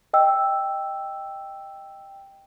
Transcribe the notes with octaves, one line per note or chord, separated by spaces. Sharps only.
D#5 G5 E6